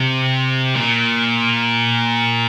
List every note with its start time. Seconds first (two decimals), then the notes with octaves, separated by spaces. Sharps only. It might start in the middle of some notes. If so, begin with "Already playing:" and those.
Already playing: C3
0.75 A#2